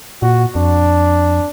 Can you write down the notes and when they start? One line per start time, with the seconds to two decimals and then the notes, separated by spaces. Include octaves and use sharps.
0.22 A#2 F#4
0.55 F2 D4